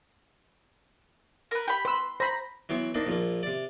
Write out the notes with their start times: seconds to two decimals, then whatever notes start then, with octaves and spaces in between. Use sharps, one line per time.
1.51 A#4 B4
1.68 G4 B5
1.85 B4 C6 E6
2.20 C5 A#5 B5
2.69 E3 F#3 B3 G5 C6 C#6
2.94 A#3 C4 D4 D#4
3.07 A#1 F3 A#3
3.43 C3 D5